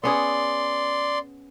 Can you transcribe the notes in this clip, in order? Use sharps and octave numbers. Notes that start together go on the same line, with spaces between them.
B3 C#4 G#4 D5 C6